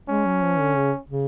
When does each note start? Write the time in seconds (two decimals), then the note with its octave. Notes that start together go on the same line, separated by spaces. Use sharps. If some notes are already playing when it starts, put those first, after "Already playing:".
0.09 G#3 C#4
0.25 F#3
0.42 F3
0.59 D3
0.76 C#3
1.10 C#3